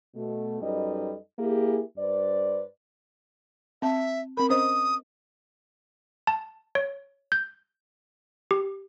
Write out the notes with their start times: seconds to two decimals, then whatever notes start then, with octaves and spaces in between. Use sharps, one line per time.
0.15 B2 A3
0.62 F#2 G3 D#4 A4 B4 D#5
1.38 A#3 E4 G4 G#4
1.97 G2 B4 C5 D5
3.82 C4 E5 A5
4.37 C4 A#4 B5
4.50 C#4 C5 D#5 D#6
6.27 A5
6.75 C#5
7.32 G6
8.51 G4